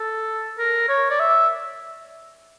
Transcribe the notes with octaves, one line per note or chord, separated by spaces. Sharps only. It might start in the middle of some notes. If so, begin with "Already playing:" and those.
Already playing: A4
A#4
C#5
D5
E5